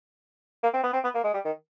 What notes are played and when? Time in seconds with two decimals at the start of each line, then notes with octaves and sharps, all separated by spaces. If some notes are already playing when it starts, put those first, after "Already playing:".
0.63 A#3
0.74 C4
0.84 B3
0.93 C4
1.04 B3
1.15 A#3
1.24 G#3
1.34 G3
1.45 D#3